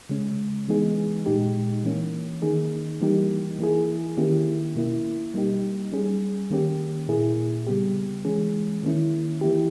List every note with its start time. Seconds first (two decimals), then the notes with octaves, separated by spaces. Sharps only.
0.09 C#3 G#3 C#4
0.68 E3 G#3 B3 D#4 G#4
1.26 A#2 G#3 D#4 G4
1.84 E3 A#3 C#4
2.42 D#3 A#3 D#4 G#4
3.01 E3 G3 A#3 D#4 G4
3.59 E3 A#3 E4 G#4
4.17 D#3 A#3 C#4 E4 G4
4.76 B2 A#3 E4
5.34 G3 A#3 D#4 G4
5.93 G3 C#4 G#4
6.50 D#3 A#3 C#4 G4
7.08 A#2 A#3 E4 G#4
7.67 C#3 G3 B3 G4
8.25 E3 G#3 C#4 G#4
8.83 D#3 A#3 C#4 E4
9.41 E3 A#3 E4 G4